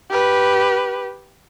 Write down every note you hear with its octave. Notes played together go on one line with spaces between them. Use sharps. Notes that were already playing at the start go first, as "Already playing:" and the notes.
G4 B4